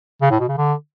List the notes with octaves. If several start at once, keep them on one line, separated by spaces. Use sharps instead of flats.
C#3
A2
B2
C#3
D3